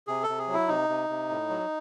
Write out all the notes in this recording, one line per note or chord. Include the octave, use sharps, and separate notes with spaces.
C3 G#4
A4
C3
G#4
F#3
E4
C3 D#4
C3
C3
A2
F#3